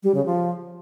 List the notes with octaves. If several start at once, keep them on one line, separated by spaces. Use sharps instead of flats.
G3
C#3
F3